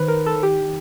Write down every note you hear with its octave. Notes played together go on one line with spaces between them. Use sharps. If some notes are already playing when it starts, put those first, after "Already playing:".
Already playing: D#3 B4 C5
A#4
A4
G4